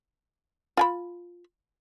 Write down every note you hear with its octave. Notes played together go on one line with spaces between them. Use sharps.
F4 G#5 B5